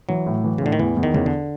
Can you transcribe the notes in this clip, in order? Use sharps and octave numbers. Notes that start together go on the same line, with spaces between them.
E3 F#3
A2
E3
C#3
A2 D3
D#3
E2 E3
E2
D#3
E2 C#3
D3